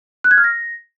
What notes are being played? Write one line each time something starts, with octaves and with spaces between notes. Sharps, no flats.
F#6
G#6
F6
A#6